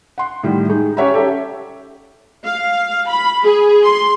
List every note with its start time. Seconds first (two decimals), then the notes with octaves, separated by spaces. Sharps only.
0.18 F#5 C6
0.43 A2 D#3 G3
0.69 G#3 D#4
0.97 C#4 G4 C#5 E5 F#5 A#5
1.14 G4 A4 C#5 E5
2.45 F5
3.09 B5
3.43 G#4
3.85 C6